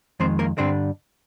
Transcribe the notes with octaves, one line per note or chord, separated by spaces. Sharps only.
F2 D#3 G#3 C4 C5
A#3 A#4
G2 D3 G3 C4 D4 C5